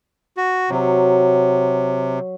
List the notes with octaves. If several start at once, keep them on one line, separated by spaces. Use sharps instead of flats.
F#4
C3 F#3